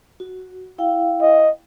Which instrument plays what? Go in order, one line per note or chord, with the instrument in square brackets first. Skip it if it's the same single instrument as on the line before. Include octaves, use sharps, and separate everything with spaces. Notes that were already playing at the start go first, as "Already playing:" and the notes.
[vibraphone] F#4
E4 F5 G5
[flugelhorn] D#5